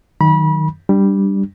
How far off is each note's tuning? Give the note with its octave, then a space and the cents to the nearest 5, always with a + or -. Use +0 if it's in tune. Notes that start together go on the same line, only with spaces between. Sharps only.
D#3 +0 F#3 +0 B5 -30
G3 +0 D4 +0